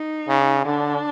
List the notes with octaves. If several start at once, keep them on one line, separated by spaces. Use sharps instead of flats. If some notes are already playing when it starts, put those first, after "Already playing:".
Already playing: D#4
C#3
D3 D4